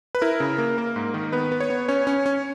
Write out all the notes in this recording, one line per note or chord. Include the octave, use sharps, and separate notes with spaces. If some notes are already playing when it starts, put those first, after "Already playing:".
B4
E4 A#4
C#3
A#3
A#3
G#2
D#3
B3 B4
B3
C#5
B3
C#4 C#5
C#4
C#4